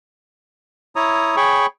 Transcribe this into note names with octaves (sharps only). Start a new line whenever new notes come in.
E4 C#5 A#5 D#6
G#4 C#5 G5 B5 C#6